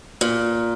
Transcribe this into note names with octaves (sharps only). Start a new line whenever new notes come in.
A#2